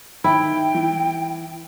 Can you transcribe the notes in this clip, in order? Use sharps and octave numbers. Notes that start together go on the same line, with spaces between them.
D#3 E4 G5
E3